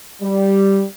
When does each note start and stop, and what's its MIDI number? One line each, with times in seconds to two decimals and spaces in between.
0.22 0.83 55